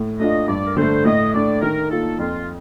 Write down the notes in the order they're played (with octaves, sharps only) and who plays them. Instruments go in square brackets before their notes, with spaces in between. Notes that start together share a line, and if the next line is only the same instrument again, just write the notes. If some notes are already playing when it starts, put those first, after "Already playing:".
Already playing: [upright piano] A2
[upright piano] A3 D4 F4 [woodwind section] D#5
[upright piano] G2 [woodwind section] D5
[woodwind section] A#4
[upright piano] D3 A3 [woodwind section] C5
[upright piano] A2 [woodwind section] D#5
[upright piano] A3 D4 [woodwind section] D5
[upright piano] D#3 [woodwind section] A#4
[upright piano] A#3 F4 [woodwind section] A4
[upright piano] F2 [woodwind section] F4